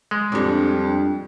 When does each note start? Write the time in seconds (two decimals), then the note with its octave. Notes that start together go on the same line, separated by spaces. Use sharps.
0.11 G#3
0.32 F2 G3 D4